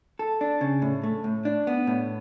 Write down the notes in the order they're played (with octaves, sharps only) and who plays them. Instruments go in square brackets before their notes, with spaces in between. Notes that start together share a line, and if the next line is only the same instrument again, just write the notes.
[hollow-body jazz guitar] A4
D4
C#3
A2
A3
A2
D4
B3
A2